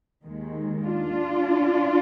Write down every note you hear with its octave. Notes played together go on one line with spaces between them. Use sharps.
D#2 D#3 G#3
D4 F4